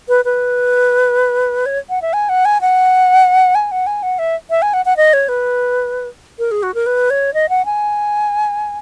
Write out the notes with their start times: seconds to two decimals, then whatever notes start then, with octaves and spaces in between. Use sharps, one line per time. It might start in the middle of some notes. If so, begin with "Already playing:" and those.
0.08 B4
0.25 B4
1.66 C#5
1.89 F#5
2.02 E5
2.13 G#5
2.29 F#5
2.45 G#5
2.61 F#5
3.55 G#5
3.71 F#5
3.86 G#5
4.03 F#5
4.19 E5
4.50 E5
4.62 G#5
4.73 F#5
4.85 F#5
4.97 D#5
5.13 C#5
5.28 B4
6.39 A#4
6.51 G#4
6.63 F#4
6.74 A#4
6.86 B4
7.10 C#5
7.34 D#5
7.49 F#5
7.65 G#5